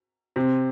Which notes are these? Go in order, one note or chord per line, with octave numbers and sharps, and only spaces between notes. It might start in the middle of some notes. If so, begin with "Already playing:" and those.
C3 C4